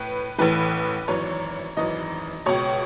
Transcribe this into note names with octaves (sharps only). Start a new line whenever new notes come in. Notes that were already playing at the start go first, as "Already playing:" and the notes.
Already playing: A2 B4
A1 A2 E3 B4
G#1 F#2 E3 C#5
G#1 F#2 E3 D#5
C#2 B2 C#5